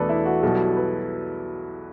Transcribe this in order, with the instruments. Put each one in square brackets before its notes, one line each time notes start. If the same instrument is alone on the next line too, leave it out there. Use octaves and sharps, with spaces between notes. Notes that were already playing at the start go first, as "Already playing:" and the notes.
Already playing: [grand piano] E2 B2 A3 D4 [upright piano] A4 B4
[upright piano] E4
F#4
[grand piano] B1 B2 G3 [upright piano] A4
[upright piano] B4